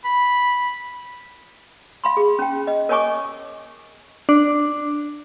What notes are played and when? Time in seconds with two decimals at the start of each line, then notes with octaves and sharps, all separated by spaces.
0.04 B5
2.04 F5 B5 C6
2.17 G#4
2.39 C#4 G5
2.67 D#5
2.89 A#4 C#5 D#5 G#5 C#6 D6
4.29 D4